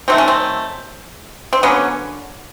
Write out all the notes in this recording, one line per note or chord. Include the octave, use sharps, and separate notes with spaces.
D#3 F#3 A3 C4
C#4
C4
C4
D3 F#3 A#3 B3 C#4